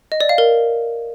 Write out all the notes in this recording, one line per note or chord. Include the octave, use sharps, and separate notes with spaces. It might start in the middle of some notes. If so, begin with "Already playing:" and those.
D#5
D5
F5
A#4